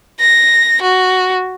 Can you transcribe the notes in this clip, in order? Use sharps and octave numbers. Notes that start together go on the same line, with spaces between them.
A#6
F#4